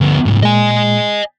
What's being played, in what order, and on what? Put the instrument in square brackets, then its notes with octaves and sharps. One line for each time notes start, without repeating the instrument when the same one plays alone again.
[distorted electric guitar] D2 B3
C2 G#2
[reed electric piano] A#2 G#3 [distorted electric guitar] D#5 G#5